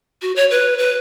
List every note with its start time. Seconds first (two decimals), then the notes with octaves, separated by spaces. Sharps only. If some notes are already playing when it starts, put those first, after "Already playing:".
0.22 F#4
0.36 C#5
0.51 B4
0.78 B4